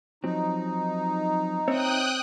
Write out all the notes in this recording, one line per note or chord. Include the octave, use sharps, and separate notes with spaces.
F3 F#3 C4 D#4
C4 C#5 E5 G5 D#6 F#6